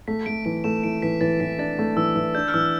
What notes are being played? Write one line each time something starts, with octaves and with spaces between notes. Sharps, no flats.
A3 B6
A3 D7
E3 D7
A3 E7
E3 D7
E3 B6
E3 A6
E3 B6
D4 A6
A3
E3 E6
E3
D4 G6
F6
E3 E6